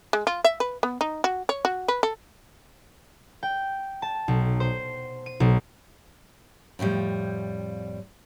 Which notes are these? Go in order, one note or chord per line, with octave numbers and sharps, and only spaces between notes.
G#3
F4
E5
B4
B3
D#4
F#4
C#5
F#4
B4
A4
G5
A5
B1
C5
D#7
B1
F2 A2 F3 G3